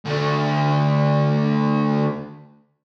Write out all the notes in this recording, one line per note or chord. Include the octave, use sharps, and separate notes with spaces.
D2 A3